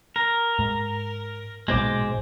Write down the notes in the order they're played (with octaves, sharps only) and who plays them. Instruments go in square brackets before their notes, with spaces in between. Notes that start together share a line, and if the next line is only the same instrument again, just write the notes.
[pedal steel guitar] A#4
[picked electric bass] G#2
[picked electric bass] A#1 G#2 B2 [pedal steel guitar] G#3 C5 D6